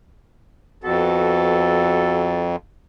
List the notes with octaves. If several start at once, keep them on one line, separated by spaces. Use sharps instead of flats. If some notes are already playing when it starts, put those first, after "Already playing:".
F2 B3 F#4 A4